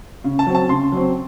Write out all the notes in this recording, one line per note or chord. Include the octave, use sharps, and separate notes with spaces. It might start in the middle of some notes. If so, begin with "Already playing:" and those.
C#3
A5
F#3 C4
A5
C#3 C6
F#3 C4